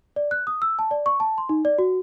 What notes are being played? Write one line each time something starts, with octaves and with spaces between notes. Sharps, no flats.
D5
F#6
D#6
E6
A5
D5
C#6
A5
C6
D#4
D5
F#4